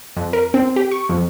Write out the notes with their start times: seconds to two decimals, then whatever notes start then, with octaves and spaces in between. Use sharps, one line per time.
0.17 F2
0.33 A#4
0.54 C4
0.76 G4
0.91 C#6
1.09 F2